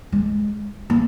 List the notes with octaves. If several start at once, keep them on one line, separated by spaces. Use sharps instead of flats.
G#3
A#3